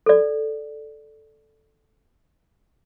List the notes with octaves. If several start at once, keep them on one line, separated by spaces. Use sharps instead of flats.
A4 D5